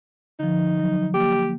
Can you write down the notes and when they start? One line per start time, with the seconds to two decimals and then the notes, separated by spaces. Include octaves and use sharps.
0.39 D3 F3 D#4
0.80 F#3
1.14 A#3 G4